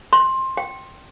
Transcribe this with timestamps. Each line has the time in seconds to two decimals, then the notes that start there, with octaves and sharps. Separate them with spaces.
0.13 C6
0.57 G5